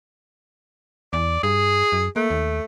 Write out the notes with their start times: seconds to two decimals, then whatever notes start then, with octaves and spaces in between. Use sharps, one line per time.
1.13 E2 D5
1.43 G2 G#4
1.92 F#2
2.16 A3 A#3
2.30 D#2